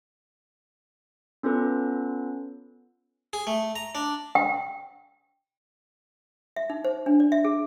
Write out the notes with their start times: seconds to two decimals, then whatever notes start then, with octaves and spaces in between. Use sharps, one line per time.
1.43 B3 C#4 F4 A4 B4
3.33 G#4
3.47 A3
3.76 A#5
3.95 D4
4.35 G5
6.56 E5
6.70 D#4
6.85 C5
7.06 D4
7.20 D5
7.32 E5
7.45 G#4